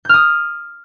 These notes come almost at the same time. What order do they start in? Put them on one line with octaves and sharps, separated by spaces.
G6 F6 D#6